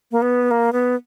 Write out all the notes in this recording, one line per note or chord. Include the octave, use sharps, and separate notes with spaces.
A#3
B3
A#3
B3